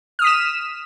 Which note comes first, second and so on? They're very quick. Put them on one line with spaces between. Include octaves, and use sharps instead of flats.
F6 D#6 B6 E7